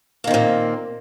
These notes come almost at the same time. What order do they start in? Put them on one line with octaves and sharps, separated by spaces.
A#3 D#3 C4 A#2